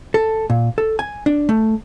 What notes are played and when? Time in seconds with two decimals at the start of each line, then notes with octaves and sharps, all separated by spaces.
0.14 A4
0.50 A#2
0.78 A4
0.99 G#5
1.26 D4
1.49 A3